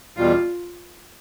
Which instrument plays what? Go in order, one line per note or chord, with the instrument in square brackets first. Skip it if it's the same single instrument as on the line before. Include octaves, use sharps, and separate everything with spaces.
[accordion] E2 B2 G3 [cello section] F4